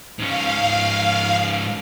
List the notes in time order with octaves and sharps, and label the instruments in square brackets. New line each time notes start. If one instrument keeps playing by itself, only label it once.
[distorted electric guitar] G#2 C#4 [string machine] F5